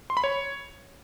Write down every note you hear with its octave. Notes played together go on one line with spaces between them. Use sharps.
C6
B5
C#5